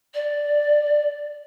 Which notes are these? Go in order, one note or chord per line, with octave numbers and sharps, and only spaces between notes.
D5